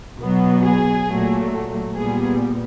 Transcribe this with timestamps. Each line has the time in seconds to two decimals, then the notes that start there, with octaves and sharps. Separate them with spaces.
0.19 B2 F#3 B3
0.63 G#4
1.08 A#2 F#3 A3
1.94 A#2 G3 B3 G#4